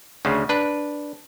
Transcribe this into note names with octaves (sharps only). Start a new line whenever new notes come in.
D2 C#3
D4 B4